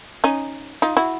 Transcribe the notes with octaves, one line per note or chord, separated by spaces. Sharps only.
C#4 D#4
D#4 F4
E4 F#4